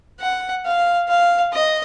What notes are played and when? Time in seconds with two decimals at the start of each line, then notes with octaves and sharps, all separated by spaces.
0.20 F#5
0.65 F5
1.08 F5
1.53 D#5